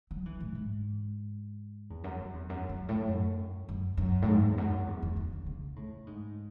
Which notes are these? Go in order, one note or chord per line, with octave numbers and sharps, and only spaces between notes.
F#3
E3
A2
G#2
E2
F#2
F#2
E2
F#2
F#2
A2
F#2
F#2
F#2
A2
G#2
E2
F#2
E2
E2
E2
C#3
C#3
A2
G#2